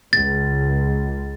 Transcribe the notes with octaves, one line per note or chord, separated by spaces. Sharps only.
C#2 A6